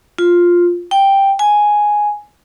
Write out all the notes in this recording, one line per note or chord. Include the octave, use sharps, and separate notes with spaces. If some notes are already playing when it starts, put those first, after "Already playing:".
F4
G5
G#5